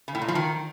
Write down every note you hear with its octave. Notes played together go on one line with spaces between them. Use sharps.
C#3
A2
A#2
F3
D#3